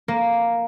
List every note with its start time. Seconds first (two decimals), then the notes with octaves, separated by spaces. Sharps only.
0.08 A#3